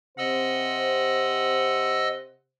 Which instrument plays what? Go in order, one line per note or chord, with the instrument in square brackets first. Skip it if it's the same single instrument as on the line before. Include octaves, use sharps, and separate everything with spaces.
[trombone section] C3 C5 [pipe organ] D#5 E6 [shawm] F#5